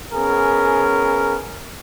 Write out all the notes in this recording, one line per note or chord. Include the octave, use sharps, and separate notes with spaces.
B3 C#4 G#4 A#4